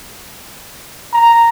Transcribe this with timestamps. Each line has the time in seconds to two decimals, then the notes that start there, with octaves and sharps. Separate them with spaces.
1.14 A#5